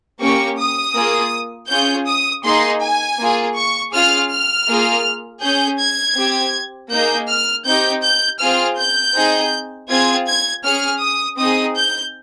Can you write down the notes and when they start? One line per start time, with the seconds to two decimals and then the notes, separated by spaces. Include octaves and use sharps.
0.21 A#3 C#4 G4 C#6
0.58 D#6
0.96 A#3 F4 G#4
1.70 C#4 F4 G#4 G6
2.07 D#6
2.44 A#3 D#4 G#4 C6
2.82 G#5
3.19 A#3 F4 G#4
3.56 C#6
3.93 C#4 F4 G#4 F6
4.31 F6
4.68 A#3 F4 G#4
5.42 C#4 G#4 G6
5.80 G#6
6.16 C4 G4
6.91 A#3 D#4 G#4 G6
7.29 F6
7.66 C4 D#4 G4 G6
8.03 G6
8.41 C4 F4 G#4 F6
8.78 G6
9.15 C4 D#4 G#4
9.89 C4 F4 G#4 G#6
10.27 G#6
10.64 C#4 G#4 F6
11.01 D#6
11.38 C4 D#4 G#4 D#6
11.76 G6